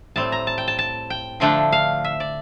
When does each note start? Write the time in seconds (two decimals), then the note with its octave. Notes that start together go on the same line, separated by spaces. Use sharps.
0.16 A2 G3 C4 A5
0.32 A#5
0.47 A5
0.58 G5
0.68 A5
0.79 A5
1.10 G5
1.40 D3 F3 A3 D4 G5
1.72 F5
2.04 E5
2.20 D5